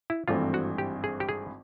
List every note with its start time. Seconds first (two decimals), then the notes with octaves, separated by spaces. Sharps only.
0.10 E4
0.28 G#1 G2 E3 A3 C4 F4
0.54 F#4
0.78 G4
1.04 G#4
1.20 G4
1.29 G#4